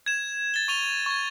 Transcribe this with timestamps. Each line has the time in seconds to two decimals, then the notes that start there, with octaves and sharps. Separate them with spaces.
0.06 G#6 E7
0.54 A6 G7
0.68 C#6 D#7 F7 G7
1.06 C#6 G#6